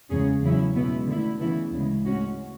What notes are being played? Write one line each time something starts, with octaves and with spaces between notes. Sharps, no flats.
E2 C#3 G#3 C#4 G#4
E2 C#3 F#3 C#4 E4
B2 G#3 B3 E4
D3 A3 E4
C#3 E3 B3 E4
D2 C#3 G#3
A2 G#3 C#4 F#4